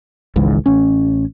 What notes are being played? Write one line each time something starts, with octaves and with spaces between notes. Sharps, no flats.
G#1 C#2 G#2 E3
A1 C#4